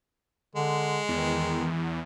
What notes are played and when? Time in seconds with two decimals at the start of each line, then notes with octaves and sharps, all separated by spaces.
0.55 D3 G#3
1.08 E2 D#3